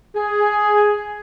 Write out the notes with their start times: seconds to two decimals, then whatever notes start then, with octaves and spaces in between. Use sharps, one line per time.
0.16 G#4